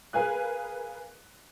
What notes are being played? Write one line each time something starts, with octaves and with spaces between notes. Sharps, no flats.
G#4 A#4 B4 F5 G#5 F#6